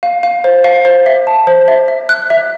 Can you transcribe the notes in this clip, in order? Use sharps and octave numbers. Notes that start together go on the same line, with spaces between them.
F5
F5
C5
F5
C5
E5
A5
C5
E5
E5
F#6
E5